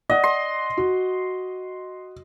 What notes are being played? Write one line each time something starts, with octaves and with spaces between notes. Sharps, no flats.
D5 D#5 F#5
C6
F#4